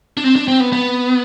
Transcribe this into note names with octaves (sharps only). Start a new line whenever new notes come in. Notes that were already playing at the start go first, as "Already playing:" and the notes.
D4
C4
D4
C4
B3
B3